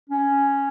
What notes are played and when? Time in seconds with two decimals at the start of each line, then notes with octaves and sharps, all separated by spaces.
0.10 C#4